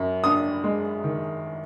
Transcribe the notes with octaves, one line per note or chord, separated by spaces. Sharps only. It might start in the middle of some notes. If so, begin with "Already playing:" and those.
Already playing: F#2
D4 D#6
G#3
D#3